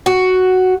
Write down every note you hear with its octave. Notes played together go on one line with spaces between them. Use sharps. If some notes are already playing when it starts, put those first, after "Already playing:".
F#4